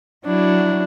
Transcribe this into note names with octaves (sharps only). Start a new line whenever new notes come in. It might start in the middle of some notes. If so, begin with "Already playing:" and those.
F#3 D4 E4